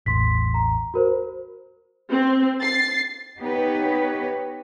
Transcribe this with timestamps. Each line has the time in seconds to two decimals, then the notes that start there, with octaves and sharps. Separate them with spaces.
0.06 A1 E2 C6 B6
0.54 A#5
0.94 F#4 A#4 C5
2.10 C4
2.61 A6 C7
3.39 B3 D#4 G4 B4 C#5